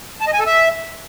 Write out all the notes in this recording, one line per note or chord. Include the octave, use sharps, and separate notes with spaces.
A5
D#5
G#5
A4
E5